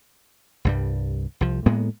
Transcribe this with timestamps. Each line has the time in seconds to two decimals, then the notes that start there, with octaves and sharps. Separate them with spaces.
0.65 C2 G2 G3
1.41 C2 F3
1.66 A2 G#3 A#3 B3